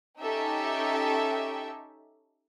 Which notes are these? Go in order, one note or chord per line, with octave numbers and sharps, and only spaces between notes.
C#4 D#4 G4 A4 E5 G5